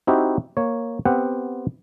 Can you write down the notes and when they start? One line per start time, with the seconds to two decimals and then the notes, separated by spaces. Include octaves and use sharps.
0.07 C4 D#4 E4 F#4 G4
0.57 A#3 C#5
1.06 B3 C4 G4 F#5